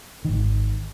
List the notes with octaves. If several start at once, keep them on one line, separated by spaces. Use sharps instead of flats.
G#1 D#3